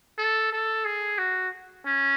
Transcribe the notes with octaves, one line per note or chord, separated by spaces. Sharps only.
A4
A4
G#4
F#4
C#4